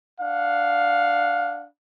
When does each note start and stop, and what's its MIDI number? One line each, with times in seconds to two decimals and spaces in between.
0.20 1.66 62
0.20 1.66 77
0.20 1.66 78